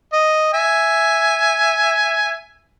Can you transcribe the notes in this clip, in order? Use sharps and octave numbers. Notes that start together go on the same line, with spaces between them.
D#5
E5 G#5